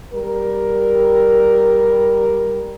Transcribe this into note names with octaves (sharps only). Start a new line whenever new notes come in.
G3 A#4